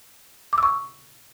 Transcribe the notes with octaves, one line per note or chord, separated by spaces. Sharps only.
D6
E6
C#6